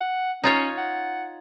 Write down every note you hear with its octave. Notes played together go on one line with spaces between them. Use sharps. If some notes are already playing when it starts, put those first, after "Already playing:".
F#5
C#4 D#4 F4 C#5
F#5